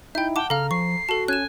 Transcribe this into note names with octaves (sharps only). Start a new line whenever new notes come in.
D#4 E4 E5 G5 G6
F#5 G5 A5 D6
C#3 A4 F5 A#5 F6
F3 C#6 C7
F#4 A4 A5
C#4 G#5 F#6 E7